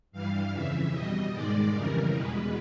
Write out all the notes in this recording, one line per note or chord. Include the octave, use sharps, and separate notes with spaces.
G2 E3 G3 F5
F2 C#3 E3 E5
B2 G3 D#5
G#2 D#3 G#3 D5
F2 C#3 E3 G3 A#4
E2 B2 G#3 B4